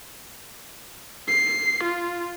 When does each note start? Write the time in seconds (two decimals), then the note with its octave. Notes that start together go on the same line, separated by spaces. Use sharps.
1.28 C7
1.84 F4